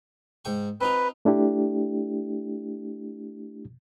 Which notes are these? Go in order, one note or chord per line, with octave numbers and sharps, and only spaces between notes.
G#2 G5 C#6
C4 D#4 F4 B4
A3 D4 E4 G4